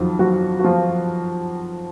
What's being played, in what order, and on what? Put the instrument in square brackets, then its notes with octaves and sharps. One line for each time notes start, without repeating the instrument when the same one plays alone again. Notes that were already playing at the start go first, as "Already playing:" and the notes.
Already playing: [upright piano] F2 D#3 F3 F#3 F4
F#3 F#4
F#4
F3 F4